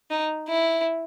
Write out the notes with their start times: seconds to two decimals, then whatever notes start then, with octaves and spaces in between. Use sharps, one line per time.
0.10 D#4
0.48 E4